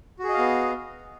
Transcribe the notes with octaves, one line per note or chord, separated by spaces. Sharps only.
B3 F#4 G#4 D#5 F5